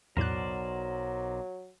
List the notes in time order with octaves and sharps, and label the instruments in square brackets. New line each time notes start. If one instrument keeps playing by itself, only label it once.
[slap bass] B1 [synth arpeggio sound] E2 A2 F#6 [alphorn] F#3 [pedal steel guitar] A#4 C5 D5